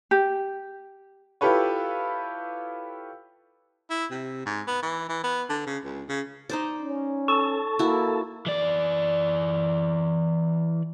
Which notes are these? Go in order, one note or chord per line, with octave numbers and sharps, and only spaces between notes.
G4
E4 F4 G4 A4 B4 C#5
E4
C3
G#2
B3
E3
E3
B3
D3
C#3
C#2
C#3
D#4 C5 D5
C#4
A4 A5 C#6
A#3 E4 F#4
E3 D5